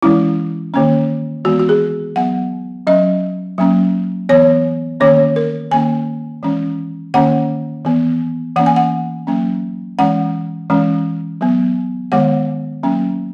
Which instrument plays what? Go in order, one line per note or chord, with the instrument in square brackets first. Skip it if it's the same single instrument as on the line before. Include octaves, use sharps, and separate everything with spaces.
[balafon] E3 G#3 C#4 E4
D#3 A#3 C#4
E3 G#3 B3 F#4
F#4
G#4
F#3 B3 F#5
F#3 C#4 D#5
F#3 A#3 C#4
E3 B3 C#5
D#3 A#3 C#4 C#5
A#4
D#3 A#3 C#4 G#5
E3 G#3 C#4
D#3 A#3 C#4 F#5
E3 B3
E3 A#3 C#4 F#5
G#5
F#5
F#3 A#3 C#4
E3 G#3 C#4 F#5
E3 G#3 C#4
F#3 B3
D#3 G#3 B3 F#5
F#3 A#3 C#4